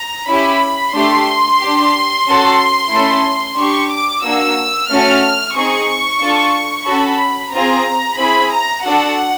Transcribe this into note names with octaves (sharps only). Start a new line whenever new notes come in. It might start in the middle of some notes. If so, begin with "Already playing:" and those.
Already playing: A#5
C#4 E4 G4 B5
A3 D4 G4 C6
D4 G4
C#4 F#4 A4
A3 C#4 E4 A4
D4 G4 C#6
D6
A#3 D4 F#4 E6
A3 C#4 F#4 A4 F6
C4 D#4 G#4 C#6
D4 F4 A4
C#4 F#4 A4 B5
C4 F4 G#4 A#5
C4 E4 G#4 B5
A#5
D4 F#4 A4 F#5